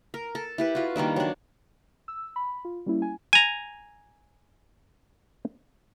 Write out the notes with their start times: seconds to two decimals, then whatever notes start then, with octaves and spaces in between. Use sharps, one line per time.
0.14 A#4
0.35 A4
0.58 E4 G4 B4
0.75 F4 F#4
0.96 D#3 G3 A#3 D4
1.16 F#3 D4
2.08 E6
2.36 B5
2.65 F4
2.86 G3 A#3 C#4 E4
3.02 G#5
3.33 G#5 A#5